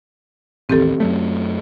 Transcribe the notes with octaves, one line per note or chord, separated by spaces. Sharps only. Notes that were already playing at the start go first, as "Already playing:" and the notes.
A1 D#2 C4 G4 A4
F#2 F#3 A3